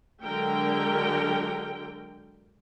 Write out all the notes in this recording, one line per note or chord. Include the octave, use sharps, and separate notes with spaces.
D3 F#3 G#3 A#4 G5